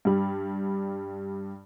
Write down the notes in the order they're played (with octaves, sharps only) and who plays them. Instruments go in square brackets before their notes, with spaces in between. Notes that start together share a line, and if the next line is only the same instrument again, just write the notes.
[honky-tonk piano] G2 G3